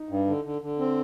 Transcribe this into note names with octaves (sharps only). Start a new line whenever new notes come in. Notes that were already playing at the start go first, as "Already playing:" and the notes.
Already playing: D#4
G2
D3
D3
D3
C4